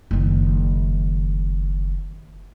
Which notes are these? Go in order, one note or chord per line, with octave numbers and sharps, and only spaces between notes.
F#1 D#3